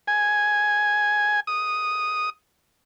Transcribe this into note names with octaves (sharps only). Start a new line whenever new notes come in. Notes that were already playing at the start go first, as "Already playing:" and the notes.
G#5
D#6